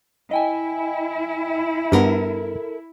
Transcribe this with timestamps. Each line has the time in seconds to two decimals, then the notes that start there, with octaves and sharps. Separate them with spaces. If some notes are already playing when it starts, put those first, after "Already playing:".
0.31 E4 D#5 G5 G#5
1.92 G2 B3 A4 A#4